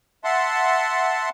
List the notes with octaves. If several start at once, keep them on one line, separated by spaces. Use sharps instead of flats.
E5 F#5 A5 C6